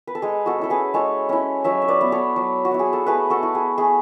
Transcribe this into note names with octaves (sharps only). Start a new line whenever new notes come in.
B4
A4
G#3 G#4
F#4 A4
C#4 E4 A4
G#4 B4
G#3 A4 C#5
C#4 E4
F#3 C#5 E5
E5
B4 D5
B3 E4
A4 C#5
F#3
F#4
B3 E4
G#4
A4
A3 G#4 B4
F#4 A4
E4
G#4
A3 G#4